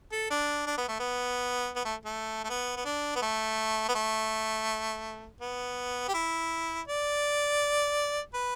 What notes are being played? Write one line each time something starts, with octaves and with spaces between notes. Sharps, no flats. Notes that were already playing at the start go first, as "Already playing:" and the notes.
A4
D4
D4
B3
A3
B3
B3
A3
A3
A3
B3
B3
D4
B3
A3
B3
A3
B3
G4
E4
D5
B4